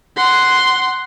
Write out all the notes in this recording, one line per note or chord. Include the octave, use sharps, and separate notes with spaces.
F#5 C6